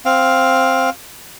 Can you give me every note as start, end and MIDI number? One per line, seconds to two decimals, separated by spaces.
0.05 0.90 60
0.05 0.90 77